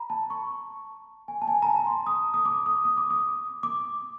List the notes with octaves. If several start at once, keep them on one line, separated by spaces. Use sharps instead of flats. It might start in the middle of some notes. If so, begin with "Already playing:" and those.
Already playing: A#5 B5
A5
C#6
G#5
A5
G#5
A#5
A5
A#5
C6
D#6
D#6
D6
D#6
D#6
D6
D#6
D6